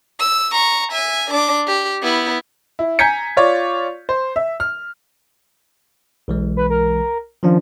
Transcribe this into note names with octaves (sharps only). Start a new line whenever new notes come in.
E6
A#5 C#6
E5 G#5
D4 D6
G4
B3 E4
E4
G#5 A#5 G6 G#6 B6 C#7
F4 C#5 D5
C5
E5
F6
B1 E3 G#3
B4
A#4
D#3 F3 C#4 D4